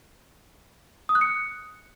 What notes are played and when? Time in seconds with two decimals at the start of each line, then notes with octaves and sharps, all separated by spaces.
1.09 D#6
1.15 F#6
1.21 C#7